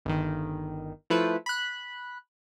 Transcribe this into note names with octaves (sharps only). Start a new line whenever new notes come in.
G1 D#3
F3 A3 E4 B4
B5 F#6